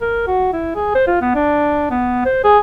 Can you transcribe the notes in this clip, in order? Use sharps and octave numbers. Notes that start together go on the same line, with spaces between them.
A#4
F#4
E4
G#4
C5
F4
B3
D4
B3
C5
G#4